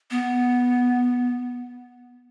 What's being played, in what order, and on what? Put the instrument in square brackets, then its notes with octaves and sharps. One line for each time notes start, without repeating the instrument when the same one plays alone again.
[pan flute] B3